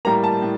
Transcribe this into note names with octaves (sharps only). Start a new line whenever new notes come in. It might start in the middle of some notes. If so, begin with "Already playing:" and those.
A2 G3 A#3 A#5
A5
A2